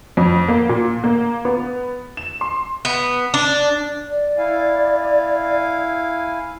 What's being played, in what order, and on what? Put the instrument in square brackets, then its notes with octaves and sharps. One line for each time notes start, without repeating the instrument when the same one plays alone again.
[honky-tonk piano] F2
A#3
A#2
A#3
B3
E7
C6
[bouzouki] B3
D4
[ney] D5
[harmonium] E4 F5 G#5